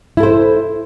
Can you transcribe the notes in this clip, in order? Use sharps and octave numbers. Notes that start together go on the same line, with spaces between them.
E4 A4 C5